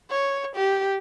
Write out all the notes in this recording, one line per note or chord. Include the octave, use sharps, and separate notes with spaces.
C#5
G4